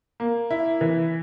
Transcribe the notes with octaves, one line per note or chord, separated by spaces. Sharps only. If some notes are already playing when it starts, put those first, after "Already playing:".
A#3
E4
E3